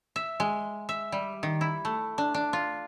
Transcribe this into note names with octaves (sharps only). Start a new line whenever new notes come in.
E5
G#3
E5
G3
D#3
E4
A3
D4
D4
F4